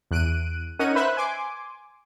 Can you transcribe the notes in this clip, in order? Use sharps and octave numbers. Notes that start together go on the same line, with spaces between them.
E2 F#6 D7 D#7
C#4 D#4 A#4 F#5 D#7
B4 C5 E5 B5 E6 F#6
G#5 C6 D6